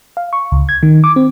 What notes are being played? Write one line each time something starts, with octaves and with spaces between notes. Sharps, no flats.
F5
C#6
C#2
G#6
D#3
D6
C4